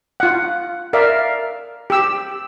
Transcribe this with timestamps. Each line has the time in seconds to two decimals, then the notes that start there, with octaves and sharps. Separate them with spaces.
0.20 F4 F#5
0.93 A#4 D5 E5 F5
1.90 G4 E6